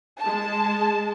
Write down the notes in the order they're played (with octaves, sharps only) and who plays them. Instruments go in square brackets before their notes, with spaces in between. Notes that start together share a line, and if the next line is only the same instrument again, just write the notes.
[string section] G#3 A5